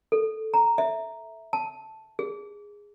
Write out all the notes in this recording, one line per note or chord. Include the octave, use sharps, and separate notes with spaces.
A4
A#5
E5
A5
G#4